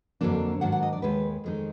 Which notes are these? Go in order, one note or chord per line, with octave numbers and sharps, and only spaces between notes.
F2 D3 F#3 A#3 D4
G#2 D#3 F#3 D4 F#5
F#5
D#5
D5
D#2 D#3 G#3 B4
F2 D#3 G#3 D#4